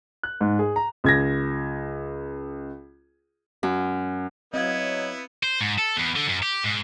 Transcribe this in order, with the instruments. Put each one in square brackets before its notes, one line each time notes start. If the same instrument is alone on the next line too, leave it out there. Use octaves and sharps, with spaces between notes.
[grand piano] F#6
G#2
G#4
A#5
C#2 G#6 A#6
[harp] F#2
[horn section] F#3 [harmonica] B3 E4 [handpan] C4 F5 [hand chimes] D#5 G#6
[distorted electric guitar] C5
G#2
A4
E2
D3
F#2
G4
G#2